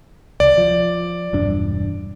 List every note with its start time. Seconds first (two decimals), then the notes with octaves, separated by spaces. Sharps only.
0.40 C2 D5
0.58 F3
1.33 E1 G2 D4